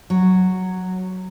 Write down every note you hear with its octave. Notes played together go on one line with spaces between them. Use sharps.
F#3